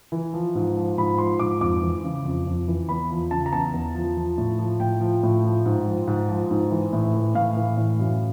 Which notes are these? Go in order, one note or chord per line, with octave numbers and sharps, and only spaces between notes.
E3
F3
G#2
F3
G#2 B5
F3 C6
G#2 D6
F2 D6
E3
C#3
F2
F2
E3
E2 B5
F3
C#3 A5
A#5
E2 A5
E2
F3
F3
A2
F3
A2 G5
F3
A2
F3
G#2
F3
G#2
F3
G#2
E3
A2
E3
A2 F5
E3
A2
F#2